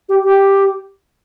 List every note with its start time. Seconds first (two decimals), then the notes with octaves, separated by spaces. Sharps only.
0.09 G4
0.24 G4